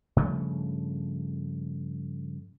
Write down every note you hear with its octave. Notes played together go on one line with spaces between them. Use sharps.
G2 C#3 F3 A3